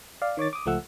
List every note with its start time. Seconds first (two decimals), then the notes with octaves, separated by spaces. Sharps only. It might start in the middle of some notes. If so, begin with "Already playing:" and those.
0.22 D5 F5
0.37 D#3 C#5 D6 A6
0.53 D6 D#6
0.66 C#2 F3 A3 F#5 E6